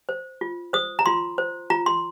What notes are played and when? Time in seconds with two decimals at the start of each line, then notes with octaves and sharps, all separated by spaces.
0.09 C5
0.41 F4
0.73 C5 D#6
0.99 A#5
1.06 F4 C6
1.38 C5
1.70 F4 A#5
1.86 C6